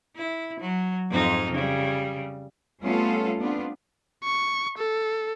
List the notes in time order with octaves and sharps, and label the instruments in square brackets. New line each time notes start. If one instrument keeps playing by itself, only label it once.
[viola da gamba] E4
F#3
F2 G#2 D#4
C#3 G3
[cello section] G3 A3 B3 C#4 F4 A4
B3 C4 D4 F4
[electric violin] C#6
A4